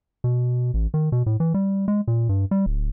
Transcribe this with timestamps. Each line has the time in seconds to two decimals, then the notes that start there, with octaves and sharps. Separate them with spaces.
0.24 B2
0.74 A1
0.94 D#3
1.12 B2
1.26 A2
1.40 E3
1.54 G3
1.88 G#3
2.08 A#2
2.29 G2
2.51 G3
2.66 D1